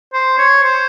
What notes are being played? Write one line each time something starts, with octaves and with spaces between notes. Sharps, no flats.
C5
C#5
C5